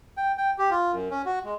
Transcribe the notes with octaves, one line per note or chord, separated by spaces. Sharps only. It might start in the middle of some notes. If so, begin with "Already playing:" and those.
G5
G5
G4
F4
F#2
C#4
F#4
G#3